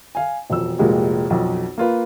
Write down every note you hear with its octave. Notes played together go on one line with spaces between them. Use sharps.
F5 G#5
E1 F2 E6
F1 A#2 G#3 F#4 G4
B1 F2
A#3 F4 B4